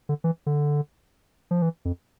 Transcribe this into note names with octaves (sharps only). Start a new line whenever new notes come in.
D3
E3
D3
F3
E3
F2